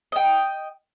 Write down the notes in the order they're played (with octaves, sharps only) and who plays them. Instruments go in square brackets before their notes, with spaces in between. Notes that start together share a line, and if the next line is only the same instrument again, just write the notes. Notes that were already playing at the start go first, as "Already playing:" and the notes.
[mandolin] D#5 G5